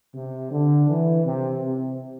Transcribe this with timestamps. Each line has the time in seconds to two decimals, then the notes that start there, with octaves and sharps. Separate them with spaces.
0.15 C3
0.52 D3
0.88 E3
1.25 C3
1.62 C3